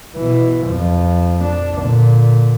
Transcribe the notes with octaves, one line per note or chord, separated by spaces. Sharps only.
B2 E3
F2 F3
D4
A#2 D3